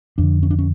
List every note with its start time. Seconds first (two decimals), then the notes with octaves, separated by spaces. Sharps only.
0.18 F2 D3 D4
0.43 C#4
0.50 D4
0.59 C#4